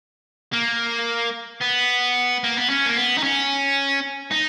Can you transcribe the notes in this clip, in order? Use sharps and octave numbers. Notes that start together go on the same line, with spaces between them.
A#3
B3
A#3
B3
C#4
A#3
B3
D#4
C#4
D#4